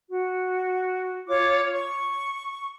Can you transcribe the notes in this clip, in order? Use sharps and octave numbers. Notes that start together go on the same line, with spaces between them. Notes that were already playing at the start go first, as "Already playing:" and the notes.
F#4
F4 C#5 D6
C#6